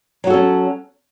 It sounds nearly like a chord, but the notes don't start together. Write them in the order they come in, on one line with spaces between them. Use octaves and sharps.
F#3 F#4 A4 C#4